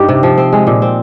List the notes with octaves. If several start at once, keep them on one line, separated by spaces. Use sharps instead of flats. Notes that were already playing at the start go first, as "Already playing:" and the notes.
Already playing: G2 D#4 G4
C3
F3
C4
G#3
A#2
C4